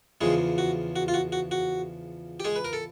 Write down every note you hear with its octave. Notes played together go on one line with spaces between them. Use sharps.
E2 C#3 F3 G#3 G#4
F#4
F#4
F4
F#4
F#4
F#4
G4
G#3 G#4
B4
A#4
A4